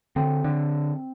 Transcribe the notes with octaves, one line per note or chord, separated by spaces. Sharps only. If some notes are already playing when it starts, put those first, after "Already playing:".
D3 C4
D3